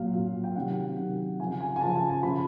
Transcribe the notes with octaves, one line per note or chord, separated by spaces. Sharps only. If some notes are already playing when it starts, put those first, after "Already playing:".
Already playing: A#2 F#3 F5
A#2 F#3
G5
C3 D#3 F#3 F#5
C3 D#3 F#3
C#3 F3 G#5
G#5
G#5
C#3 F3 A5
A5
A5
C#3 F3 B5